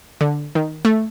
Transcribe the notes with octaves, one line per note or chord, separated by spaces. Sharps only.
D3
D#3
A3